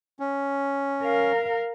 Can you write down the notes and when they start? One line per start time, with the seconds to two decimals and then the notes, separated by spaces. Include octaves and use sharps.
0.20 C#4
1.04 A#4 F5